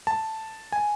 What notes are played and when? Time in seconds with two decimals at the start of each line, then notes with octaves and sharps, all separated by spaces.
0.07 A5
0.72 G#5